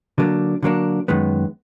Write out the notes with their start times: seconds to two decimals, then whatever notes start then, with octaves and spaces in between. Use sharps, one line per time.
0.18 D3 F#3 A#3 D4
0.63 D3 F#3 A#3 D4
1.08 F#2 D#3 G#3 B3